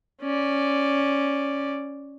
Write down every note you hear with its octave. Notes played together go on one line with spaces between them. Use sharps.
C#4 D5